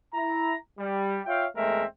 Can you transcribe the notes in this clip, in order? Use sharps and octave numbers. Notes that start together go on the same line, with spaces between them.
E4 A#5
G3
F4 C#5 E5 F5 G5
E2 G#3 A3 C4 A#4 E5